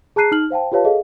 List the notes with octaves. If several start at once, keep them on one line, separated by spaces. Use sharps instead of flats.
G#4 A5 A#5 F#6 C7 D#7
D#4 F6 F#7
C5 F5 G5 A5
F4 G4 B4 C#5 F5 A5
G#4 A4 D#5 F5